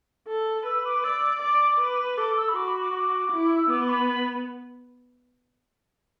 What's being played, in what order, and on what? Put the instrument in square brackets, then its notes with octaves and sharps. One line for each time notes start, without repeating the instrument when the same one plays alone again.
[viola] A4
[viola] B4 [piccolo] E6
[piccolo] D6
[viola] D5 [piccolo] E6
[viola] D5 [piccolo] D6
[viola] B4
[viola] A4 [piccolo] D6
[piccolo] E6
B5
[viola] F#4 [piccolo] D6
[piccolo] B5
D6
D6
[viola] E4
[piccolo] E6
[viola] B3 [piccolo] D6
[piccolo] D6
B5